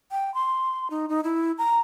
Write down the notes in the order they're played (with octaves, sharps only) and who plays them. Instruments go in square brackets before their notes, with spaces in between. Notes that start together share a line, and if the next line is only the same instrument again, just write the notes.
[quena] G5
C6
D#4
D#4
E4
A#5